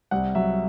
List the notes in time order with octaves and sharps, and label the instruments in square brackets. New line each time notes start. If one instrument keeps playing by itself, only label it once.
[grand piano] C2 F#5
F#3 E5